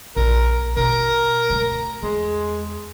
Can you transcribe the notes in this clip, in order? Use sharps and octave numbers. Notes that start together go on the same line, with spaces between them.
A#1 A#4
B2 A#3 A#4
F#3 A3
E2 G#3